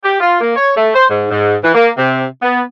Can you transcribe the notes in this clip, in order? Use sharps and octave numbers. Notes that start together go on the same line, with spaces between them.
G4
F4
A#3
C#5
A3
C5
G#2
G#2
E3
A#3
C3
B3